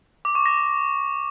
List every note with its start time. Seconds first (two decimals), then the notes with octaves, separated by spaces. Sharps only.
0.25 D6
0.35 C#6
0.46 A#6